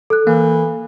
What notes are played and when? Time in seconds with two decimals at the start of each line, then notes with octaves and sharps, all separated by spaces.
0.10 A4 F#6
0.27 E3 A#3